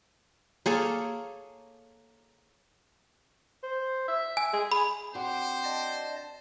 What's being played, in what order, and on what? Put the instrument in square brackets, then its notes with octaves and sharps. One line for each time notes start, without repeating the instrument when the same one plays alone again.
[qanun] A#3 G#4 A4 C#5
[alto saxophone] C5
E5
[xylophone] G#5
[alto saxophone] G#4
[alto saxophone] G#4 [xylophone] B5
[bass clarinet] C4 [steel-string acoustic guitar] D4 F#4 [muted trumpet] C5
[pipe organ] D5 D#5 A5